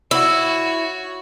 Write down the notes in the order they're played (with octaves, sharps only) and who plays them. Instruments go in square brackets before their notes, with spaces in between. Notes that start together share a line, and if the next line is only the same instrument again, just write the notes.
[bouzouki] E4 [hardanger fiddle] F#4 C#5